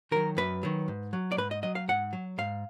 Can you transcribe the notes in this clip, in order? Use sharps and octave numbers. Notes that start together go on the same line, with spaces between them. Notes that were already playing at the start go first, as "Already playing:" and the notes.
D#3 F#3 A#4
F#2 B4
D#3 F#3
G#2
F#3
D5
G#2 B4
D#5
F#3 D#5
F5
G#2 F#5
F#3
G#2 F5